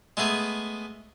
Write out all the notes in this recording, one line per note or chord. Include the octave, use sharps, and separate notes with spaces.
G#3 A3 B3 G#4